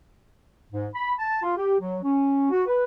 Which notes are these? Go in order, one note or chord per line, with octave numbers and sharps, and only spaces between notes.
G#2
B5
A5
F4
G4
F#3
C#4
F#4
B4